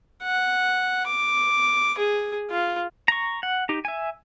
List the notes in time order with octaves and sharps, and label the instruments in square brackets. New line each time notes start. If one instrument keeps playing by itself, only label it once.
[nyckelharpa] F#5
D6
G#4
F4
[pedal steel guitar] A#5 C#6
F#5
D#4 G4
E5 G#5